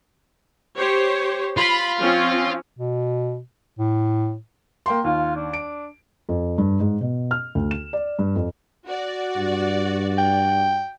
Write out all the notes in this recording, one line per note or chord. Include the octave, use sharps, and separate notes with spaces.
G4 C5 C#5
F4 B5
F3 C4 C#4
B2
A2
A#3 G5 C6
D#2 F4
D4
D7
F2
G2
G#2
B2
F6
D2
E7
D5
G2
F2
F#4 D5
G2
G5